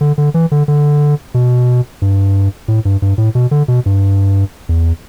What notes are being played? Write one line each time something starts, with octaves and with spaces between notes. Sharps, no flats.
D3
D3
E3
D3
D3
B2
G2
A2
G2
G2
A2
B2
D3
B2
G2
E2